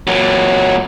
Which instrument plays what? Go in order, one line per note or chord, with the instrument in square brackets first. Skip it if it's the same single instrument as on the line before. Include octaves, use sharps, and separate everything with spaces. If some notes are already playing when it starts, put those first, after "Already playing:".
[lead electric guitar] A#2 F#3